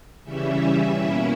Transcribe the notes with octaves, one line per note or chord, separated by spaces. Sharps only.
C#3 E3 G3 C#4 E5
B2 A#3 C#4 E4